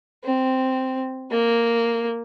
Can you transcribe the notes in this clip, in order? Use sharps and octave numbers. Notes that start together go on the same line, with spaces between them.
C4
A#3